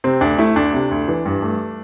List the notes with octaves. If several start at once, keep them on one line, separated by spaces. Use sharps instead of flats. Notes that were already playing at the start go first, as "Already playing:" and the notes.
C3 C4
D2 D4
A3 E4
D2 D4
C3
D2
E3
G2
A3